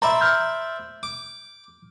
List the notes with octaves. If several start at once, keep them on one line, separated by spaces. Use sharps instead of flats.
C5 D5 E5 A#5 B5
F6 G6
D6